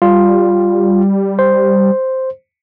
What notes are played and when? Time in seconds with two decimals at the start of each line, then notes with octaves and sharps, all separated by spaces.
0.02 G3 F4
1.39 C5